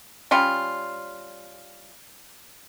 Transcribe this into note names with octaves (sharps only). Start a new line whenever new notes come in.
G3 C#4 F4